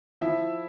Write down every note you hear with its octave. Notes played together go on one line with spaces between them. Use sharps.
F3 E4 E5